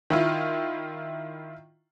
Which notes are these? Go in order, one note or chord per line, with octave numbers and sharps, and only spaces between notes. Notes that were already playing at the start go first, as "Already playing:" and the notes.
D#3 E4 F4